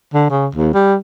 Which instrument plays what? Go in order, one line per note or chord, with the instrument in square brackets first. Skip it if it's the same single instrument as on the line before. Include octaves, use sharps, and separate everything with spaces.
[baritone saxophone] D3
C#3
D#2
G3